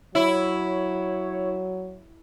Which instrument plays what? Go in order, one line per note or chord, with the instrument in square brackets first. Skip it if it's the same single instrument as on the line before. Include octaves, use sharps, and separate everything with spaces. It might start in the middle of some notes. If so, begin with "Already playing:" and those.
[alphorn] F#3 [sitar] E4 [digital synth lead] C#5